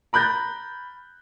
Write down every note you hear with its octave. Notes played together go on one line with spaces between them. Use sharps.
A#5 B5 F#6 G6 A6 A#6